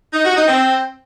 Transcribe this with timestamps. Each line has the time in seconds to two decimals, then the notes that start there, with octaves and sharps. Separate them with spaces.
0.13 D#4
0.25 F#4
0.36 D#4
0.48 C4